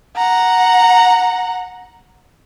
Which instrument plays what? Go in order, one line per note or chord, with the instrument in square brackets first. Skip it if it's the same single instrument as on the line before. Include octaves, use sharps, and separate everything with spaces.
[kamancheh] F#5 A#5